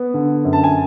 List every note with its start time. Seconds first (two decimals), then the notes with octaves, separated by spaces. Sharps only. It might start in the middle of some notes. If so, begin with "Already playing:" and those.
Already playing: B3
0.14 D3
0.45 F#2
0.53 A5
0.64 G#5